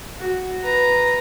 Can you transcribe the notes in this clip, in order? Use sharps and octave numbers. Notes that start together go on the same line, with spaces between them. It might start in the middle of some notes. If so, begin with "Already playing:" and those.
F#4
B4 A#5